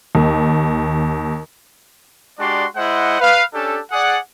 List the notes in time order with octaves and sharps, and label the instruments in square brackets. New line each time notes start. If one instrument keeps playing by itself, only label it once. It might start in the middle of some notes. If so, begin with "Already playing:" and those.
[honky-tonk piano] D#2
[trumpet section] G#3 D4 F#4 G4 D5 C6
G#3 E4 C5 D#5 F#5
B4 F5
C#4 D4 G4 A4
G#4 D5 F#5